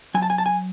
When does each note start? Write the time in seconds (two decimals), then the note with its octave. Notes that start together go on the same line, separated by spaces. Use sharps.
0.14 F#3 G#5
0.22 A5
0.30 G#5
0.38 A5
0.46 G#5